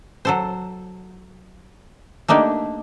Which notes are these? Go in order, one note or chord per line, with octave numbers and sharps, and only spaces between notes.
F#3 A4 C5
A3 A#3 D4 D#4 G4